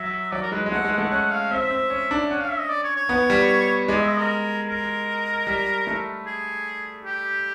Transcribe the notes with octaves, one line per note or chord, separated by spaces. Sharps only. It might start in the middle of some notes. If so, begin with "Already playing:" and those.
Already playing: F#3 E5
F#3 D5
A#4
G#3 B4
G#3
A3 F#5
G#3
F#5
A3
C#4 F#5
F5
C4 E5
C4
C#4
D4
C#4 F#5
F5
E5
D#5
D5
C#5
C#5
B3
G3
G#3 D5
E5
D#5
A#4
A#4
G3
A3
G#4
G4